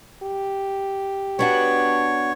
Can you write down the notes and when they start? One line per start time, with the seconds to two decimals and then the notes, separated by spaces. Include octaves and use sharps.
0.23 G4
1.39 B3 D4 F#4 C#5